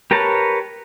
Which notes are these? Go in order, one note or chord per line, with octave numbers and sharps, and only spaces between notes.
G4 A#4 B4 C#5 A5